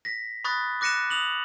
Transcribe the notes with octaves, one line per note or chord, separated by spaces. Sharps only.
A#6 B6
B5 C#6 D#6 F#6 A6 A#6
D6 F#6 A#6 C#7 D#7 E7
D#6 F7 F#7